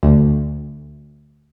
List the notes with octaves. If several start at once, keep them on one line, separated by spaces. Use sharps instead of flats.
D2